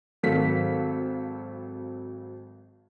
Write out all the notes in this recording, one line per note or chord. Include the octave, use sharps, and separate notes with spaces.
G#1 D#3 F#3 A4 F5 B6